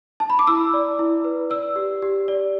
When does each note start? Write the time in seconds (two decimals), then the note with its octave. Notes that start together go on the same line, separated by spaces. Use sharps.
0.20 A5
0.30 B5
0.39 D6
0.47 E4 E6
0.74 D5
0.99 E4
1.24 B4
1.50 D5 E6
1.76 G4
2.02 G4
2.28 D5